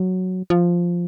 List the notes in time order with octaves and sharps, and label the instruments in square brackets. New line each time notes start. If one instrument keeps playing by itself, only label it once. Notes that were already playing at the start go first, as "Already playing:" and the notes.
Already playing: [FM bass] F#3
F3